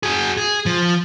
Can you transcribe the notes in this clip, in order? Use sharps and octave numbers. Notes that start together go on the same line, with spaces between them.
F#4 G#4
G#4
F3